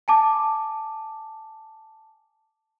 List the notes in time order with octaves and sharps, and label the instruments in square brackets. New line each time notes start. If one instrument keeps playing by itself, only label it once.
[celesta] G#5 A5 D6